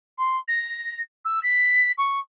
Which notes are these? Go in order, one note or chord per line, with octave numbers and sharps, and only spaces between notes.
C6
A#6
E6
B6
C#6